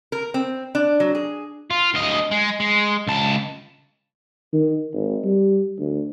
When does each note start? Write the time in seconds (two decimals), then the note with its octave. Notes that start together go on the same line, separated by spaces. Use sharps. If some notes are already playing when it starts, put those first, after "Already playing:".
0.12 A#4
0.34 C4
0.75 D4
1.00 F#3
1.15 G#4
1.71 F4
1.94 D2 D#5
2.31 G#3
2.60 G#3
3.07 C#2 A5
4.53 D#3
4.94 G#1
5.24 G3
5.79 D2